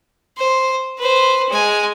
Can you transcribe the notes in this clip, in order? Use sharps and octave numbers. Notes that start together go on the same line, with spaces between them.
C5
B4 C5
G#3 G#5